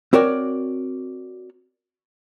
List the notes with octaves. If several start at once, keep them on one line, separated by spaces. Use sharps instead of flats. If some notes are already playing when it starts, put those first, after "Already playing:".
C4 F#4 A#4 C#5 D5